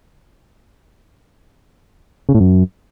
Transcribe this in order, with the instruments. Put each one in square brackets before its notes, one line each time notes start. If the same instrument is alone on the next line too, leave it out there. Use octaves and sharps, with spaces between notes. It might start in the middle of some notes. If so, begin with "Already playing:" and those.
[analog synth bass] C#3
A2
F#2